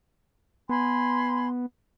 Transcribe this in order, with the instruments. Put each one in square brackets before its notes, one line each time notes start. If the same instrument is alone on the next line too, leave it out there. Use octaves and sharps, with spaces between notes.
[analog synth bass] B3 [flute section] G#5 B5 C6